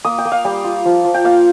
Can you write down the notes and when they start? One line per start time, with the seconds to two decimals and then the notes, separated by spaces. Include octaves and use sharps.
0.05 A#3 D#6
0.18 G5
0.25 A#3
0.32 F5
0.45 G3 G5
0.64 F4
0.85 F3
1.04 F3
1.14 G5
1.24 A#3 F5